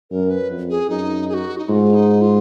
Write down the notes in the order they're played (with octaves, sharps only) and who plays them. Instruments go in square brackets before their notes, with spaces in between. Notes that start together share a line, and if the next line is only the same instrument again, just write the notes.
[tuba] F#2 [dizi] A#4
[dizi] B4
[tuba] F2
[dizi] G#4
[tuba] F#2 [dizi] D#4
[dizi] G#4
F#4
D#4
[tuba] G#2 [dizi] F4
[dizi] D#4
F4